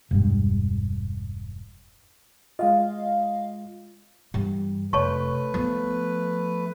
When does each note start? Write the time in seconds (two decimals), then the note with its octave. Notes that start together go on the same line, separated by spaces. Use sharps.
0.11 E1 G2
2.59 G#3 F4 D#5 F5
4.34 G2 E3
4.93 F1 A3 B4 C#5 A5 C#6
5.54 F3 B3